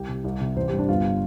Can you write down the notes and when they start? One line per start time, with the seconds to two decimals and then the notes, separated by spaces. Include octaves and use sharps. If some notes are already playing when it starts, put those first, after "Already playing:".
Already playing: C2 G4
0.08 C3
0.24 C2
0.41 C3
0.56 A1 C5
0.68 G2 G4
0.79 D4
0.89 G1 F4